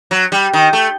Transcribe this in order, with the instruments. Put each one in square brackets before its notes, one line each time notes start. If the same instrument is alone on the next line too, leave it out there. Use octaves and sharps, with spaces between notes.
[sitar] F#3
G3
D#3
A3